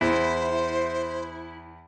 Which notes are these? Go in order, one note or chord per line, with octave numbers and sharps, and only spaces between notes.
E2 E4 C5